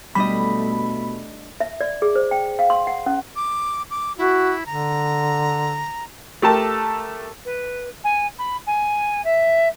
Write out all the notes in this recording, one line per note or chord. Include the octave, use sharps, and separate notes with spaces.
B2 G3 A3 D4 D#5 B5
E5
D5
G#4
C5
G5
F5
C6
F#5
C#4
D6
D6
E4 F#4
D3 A#5
A3 G4 A4 A#4 A5
B4
G#5
B5
G#5
E5